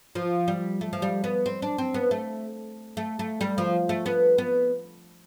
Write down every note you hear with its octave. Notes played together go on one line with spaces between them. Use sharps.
F3
G3
A3
F3
G3
B3
C4
D4
C4
B3
A3
A3
A3
G3
F3
A3
B3
B3